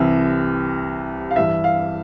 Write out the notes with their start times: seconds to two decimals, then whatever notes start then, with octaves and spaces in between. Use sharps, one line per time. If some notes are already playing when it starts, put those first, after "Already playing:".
Already playing: C2 C3 E3 E5
1.31 F5
1.36 G2 E3 E5
1.64 F5